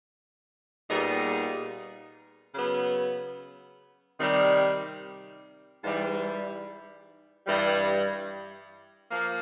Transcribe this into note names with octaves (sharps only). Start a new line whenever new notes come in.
A#2 G3 B3 D#4 G#4
C#3 F#3 B3
C3 D#3 G3
G#2 E3 G3
G2 E3 G3
F3 A#3